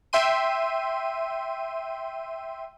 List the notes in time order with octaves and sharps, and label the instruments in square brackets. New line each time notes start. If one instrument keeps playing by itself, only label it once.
[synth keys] E5 G5 C6 D#7